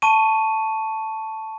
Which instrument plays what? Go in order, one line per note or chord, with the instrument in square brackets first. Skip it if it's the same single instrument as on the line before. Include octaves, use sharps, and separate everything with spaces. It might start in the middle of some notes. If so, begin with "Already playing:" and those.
[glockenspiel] A5 C#6 D#7